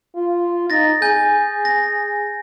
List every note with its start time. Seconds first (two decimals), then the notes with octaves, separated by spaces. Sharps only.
0.15 F4
0.70 D#4 A6 A#6
1.02 G#4 G#5 G6
1.65 A#6